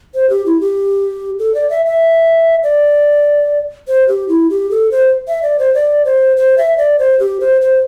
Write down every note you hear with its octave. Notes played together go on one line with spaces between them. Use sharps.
C5
G4
E4
G4
A4
D5
E5
E5
D5
C5
G4
E4
G4
A4
C5
E5
D5
C5
D5
C5
C5
E5
D5
C5
G4
C5
C5